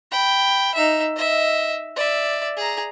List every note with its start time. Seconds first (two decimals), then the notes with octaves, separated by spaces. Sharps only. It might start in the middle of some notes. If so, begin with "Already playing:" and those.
0.12 G5 B5
0.75 D#4 E5
1.16 D#5 E5
1.96 D5 E5
2.57 G#4 A#5